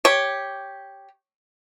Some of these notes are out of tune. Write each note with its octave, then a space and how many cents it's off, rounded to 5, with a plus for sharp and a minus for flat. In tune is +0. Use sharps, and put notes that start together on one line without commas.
G4 +0 C#5 +0